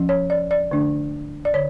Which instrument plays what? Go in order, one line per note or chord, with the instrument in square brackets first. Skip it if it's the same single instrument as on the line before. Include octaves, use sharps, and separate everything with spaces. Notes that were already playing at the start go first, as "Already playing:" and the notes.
Already playing: [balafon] F3 C#4
C#5
D5
D5
D3 A3 D4
D5
D3 C#5